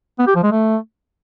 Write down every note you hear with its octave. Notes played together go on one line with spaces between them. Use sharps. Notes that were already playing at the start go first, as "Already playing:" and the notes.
B3
G4
F3
G#3
A3